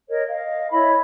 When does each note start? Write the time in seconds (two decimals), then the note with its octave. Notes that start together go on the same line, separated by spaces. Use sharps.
0.09 A#4 C#5 D#5
0.29 D#5 F5
0.71 E4 C#5 D#5 B5